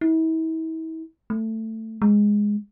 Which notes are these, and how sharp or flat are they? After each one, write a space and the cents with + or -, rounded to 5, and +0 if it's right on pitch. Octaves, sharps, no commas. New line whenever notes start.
E4 -40
A3 +15
G#3 -5